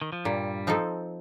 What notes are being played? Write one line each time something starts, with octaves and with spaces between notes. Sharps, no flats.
D#3
F3
G2 A#2 G3
F3 C4 D#4 A4